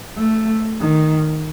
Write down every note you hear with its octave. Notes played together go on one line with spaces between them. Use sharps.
A3
D#3